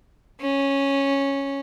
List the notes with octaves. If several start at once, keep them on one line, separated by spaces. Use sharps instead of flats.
C#4